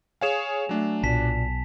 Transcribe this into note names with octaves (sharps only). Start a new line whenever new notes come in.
G#4 C#5 F5 G#5 E7 F7
F#3 A3 D4
B1 A#2 A5 B6